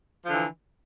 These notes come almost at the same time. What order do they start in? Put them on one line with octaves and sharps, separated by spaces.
F3 D3 E3